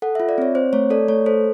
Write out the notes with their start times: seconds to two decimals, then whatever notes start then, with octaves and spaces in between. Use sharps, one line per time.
0.02 A4 F#5
0.15 F4 E5
0.29 D5
0.38 C4 C#5
0.55 C4 C5
0.73 A3 C#5
0.90 A4 D5
1.08 A3 C#5
1.26 A4 C5